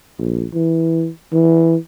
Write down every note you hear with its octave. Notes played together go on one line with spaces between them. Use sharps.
A#1
E3
E3